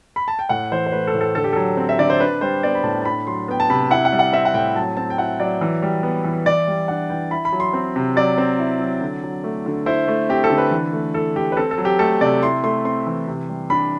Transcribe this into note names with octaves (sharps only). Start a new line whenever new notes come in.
B5
A5
G5
A2 F#5
E3 C5
C5
A3 B4
A4
A2
A4
D3 A4
G4
F#3 A4
C4
E5
D3 D5
C5
D4 B4
G3 C5
B3 D5
B5
A2 A5
A5
D4 B5
F#3 C6
B3 G5
A5
C3 B5
E4 F#5
F#5
G3
F#5
C4 E5
F#5
A2 G5
F#3 A5
C4 A5
G5
E4 F#5
F#3 D5
E3
G3
B3
E3
E3 D5
G3
D4 F#5
E3 G5
E4 B5
B5
F#3
C6
C4
C3
F#3 D5
C4
E4
F#3
D3
F#3
A3
D3
E4 C5
A3
C4 G4
A4
D3
B4
E3
A3
E4 A4
E3 G4
B4
C4 A4
A4
F#3
G4
A3 A4
C3 D5
E4 C6
A3 C6
C4 C6
E3
C3
G3
D4 B5